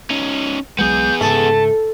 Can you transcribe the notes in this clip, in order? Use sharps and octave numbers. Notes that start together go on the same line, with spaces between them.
C#4 D#4
B1 F#3 G#3 B3 G#4 G6
G#2 C#3 A3 A5